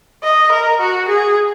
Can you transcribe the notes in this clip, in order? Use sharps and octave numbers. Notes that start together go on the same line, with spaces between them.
D#5
A#4
F#4
G#4